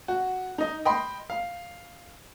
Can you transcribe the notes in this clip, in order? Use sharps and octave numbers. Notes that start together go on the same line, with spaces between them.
F#4
D#4 D#5
D#5 G5 B5 C6
F5